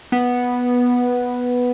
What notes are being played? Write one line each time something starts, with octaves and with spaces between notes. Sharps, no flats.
B3